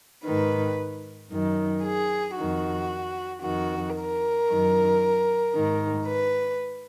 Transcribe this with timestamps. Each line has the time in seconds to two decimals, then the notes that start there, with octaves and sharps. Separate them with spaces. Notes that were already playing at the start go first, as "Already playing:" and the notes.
0.25 G#2 D#3 B4
1.31 F#2 D#3
1.84 G#4
2.37 F2 D#3 F#4
3.42 F2 D#3 F#4
3.96 A#4
4.49 F#2 D#3
5.54 G#2 D#3
6.07 B4